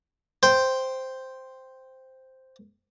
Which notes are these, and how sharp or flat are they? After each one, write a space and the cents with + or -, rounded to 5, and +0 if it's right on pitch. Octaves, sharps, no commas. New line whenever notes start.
C5 +0 G5 +0